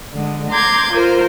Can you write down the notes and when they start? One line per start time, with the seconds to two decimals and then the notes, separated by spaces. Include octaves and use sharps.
0.12 D3 G#3
0.50 A#5 C6 D6 G6 G#6
0.92 F4 A#4 C5